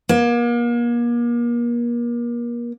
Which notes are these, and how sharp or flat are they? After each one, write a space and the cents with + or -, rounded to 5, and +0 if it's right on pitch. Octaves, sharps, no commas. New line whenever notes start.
A#3 +35